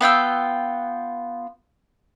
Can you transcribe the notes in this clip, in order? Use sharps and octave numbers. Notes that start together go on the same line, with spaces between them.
B3 F4 G5 E6